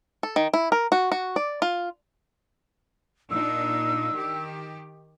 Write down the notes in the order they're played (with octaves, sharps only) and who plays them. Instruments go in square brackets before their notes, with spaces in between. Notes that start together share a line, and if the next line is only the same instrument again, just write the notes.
[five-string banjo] A4
D#3
E4
A#4
F#4
F#4
D5
F4
[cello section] A#2 D4 D#4 [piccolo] E6
[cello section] D#3 G4